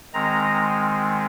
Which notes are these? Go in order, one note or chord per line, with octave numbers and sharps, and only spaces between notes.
D#3 G#3 C4 A#5